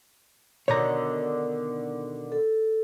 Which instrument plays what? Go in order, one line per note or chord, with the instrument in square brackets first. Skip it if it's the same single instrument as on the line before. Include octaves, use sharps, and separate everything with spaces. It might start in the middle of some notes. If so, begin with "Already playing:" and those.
[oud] B2 D3 D#3 [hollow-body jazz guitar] C#5 A#5
[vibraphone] A4